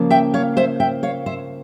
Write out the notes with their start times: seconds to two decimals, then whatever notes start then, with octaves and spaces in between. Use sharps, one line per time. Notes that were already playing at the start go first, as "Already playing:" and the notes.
Already playing: C#3 F3 A#3
0.10 E5 G5
0.34 C#5 F5
0.57 C5 E5
0.80 E5 G5
1.03 C#5 F5
1.26 C5 E5